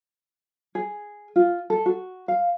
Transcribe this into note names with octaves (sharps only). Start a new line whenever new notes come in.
G#4
F4
A4
F#4
F5